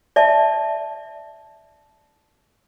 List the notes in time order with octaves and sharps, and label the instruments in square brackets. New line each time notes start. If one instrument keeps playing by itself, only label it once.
[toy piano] D5 E5 A5